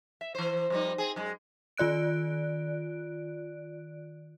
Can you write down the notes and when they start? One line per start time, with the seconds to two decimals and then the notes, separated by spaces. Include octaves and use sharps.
0.21 E5
0.35 E3 C5
0.70 F2 G3 D#4
0.98 C4 G#4
1.16 F#2 G#3
1.77 D#3 F4 D5 F#6 D7